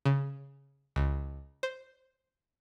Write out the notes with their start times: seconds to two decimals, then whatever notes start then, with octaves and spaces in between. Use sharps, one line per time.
0.05 C#3
0.96 C#2
1.63 C5